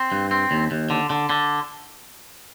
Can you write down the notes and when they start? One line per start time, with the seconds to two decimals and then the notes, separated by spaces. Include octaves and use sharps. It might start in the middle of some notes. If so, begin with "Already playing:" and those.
Already playing: C4
0.12 G2
0.31 C4
0.51 D#2
0.71 D#2
0.90 D3
1.10 D3
1.30 D3